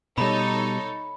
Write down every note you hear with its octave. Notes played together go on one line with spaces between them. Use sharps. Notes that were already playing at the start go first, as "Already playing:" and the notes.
B2 G3 D#4 A4 C#5 B5